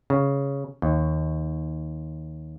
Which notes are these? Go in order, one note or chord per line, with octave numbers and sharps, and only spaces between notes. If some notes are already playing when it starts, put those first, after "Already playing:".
C#3
D#2